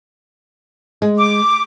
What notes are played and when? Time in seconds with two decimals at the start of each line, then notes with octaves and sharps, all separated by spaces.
1.02 G#3
1.18 D6